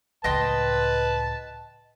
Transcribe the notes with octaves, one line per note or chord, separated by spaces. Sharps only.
C#2 A2 B4 D#5 G5 A5 C6